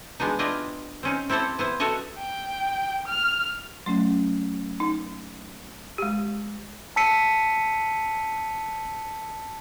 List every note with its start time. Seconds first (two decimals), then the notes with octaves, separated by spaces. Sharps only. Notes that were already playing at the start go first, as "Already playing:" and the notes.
0.20 G#3 B3 D4 D#4
0.39 D4 E4 F4 G4 D5 D#5
1.03 C4 C#4 D#4
1.30 C4 E4 G4 A4 C5
1.59 B3 E4 C5
1.80 A3 F#4 A4 C#5 D#5 E5
2.19 G5
3.08 F6
3.86 F#3 A3 C#4 C6
4.80 D#4
5.98 G#3 G4
6.96 A5 E6 B6 C#7 D#7